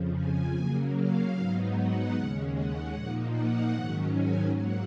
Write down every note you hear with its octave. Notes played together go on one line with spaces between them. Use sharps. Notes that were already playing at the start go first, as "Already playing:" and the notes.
Already playing: F2 C#3 F3
G#5
C#3 F#3 A#3
F5
G#2 F#3 B3 D#4
F#5
D#2 C#3 G#3 C#4
F#5
A#2 F3 A#3 D#4
F#5
G#2 D#3 F#3 C#4
G#5
G#2 F#3 A#3 F#5